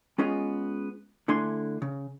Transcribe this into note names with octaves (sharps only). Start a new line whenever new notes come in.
G#3 B3 C#4 F4 G#4 D#5
D3 A3 D4 E4 G#5 C6
C#3